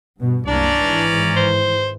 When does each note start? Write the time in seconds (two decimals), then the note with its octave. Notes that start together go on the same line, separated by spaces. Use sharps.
0.18 G2 B2
0.47 C2 F#2 A#3 C#4 D4 D5 A#5
0.79 G#1 G#2 E3
1.36 C5